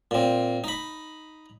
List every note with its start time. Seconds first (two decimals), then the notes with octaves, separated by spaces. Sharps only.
0.11 A#2 C4
0.64 D#4 B5